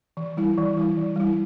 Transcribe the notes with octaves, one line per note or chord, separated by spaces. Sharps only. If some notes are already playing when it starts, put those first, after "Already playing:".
E3
G3 E4
E3
G3 E4
E3
G3 E4